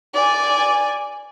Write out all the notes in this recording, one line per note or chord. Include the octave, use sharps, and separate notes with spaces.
D5 G#5